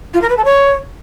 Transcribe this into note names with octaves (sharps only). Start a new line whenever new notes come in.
F4
A#4
B4
A4
C#5